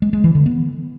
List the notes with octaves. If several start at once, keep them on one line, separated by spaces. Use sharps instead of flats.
G#3
G#3
E3
D3
B3